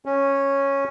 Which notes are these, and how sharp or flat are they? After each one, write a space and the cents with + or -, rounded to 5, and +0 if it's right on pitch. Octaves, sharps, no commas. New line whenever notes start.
C#4 -5